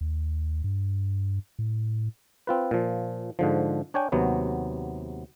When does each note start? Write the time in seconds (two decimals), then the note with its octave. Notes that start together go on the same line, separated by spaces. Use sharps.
0.01 D#2
0.64 G2
1.59 A2
2.47 C4 F4 B4
2.71 A#2 F3
3.39 G#2 D3 F3
3.94 D4 C#5 G5 G#5
4.12 D#2 C3 F#3 B3